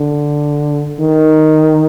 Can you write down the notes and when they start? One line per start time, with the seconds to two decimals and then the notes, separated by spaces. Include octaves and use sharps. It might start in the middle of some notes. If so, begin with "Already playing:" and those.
Already playing: D3
0.99 D#3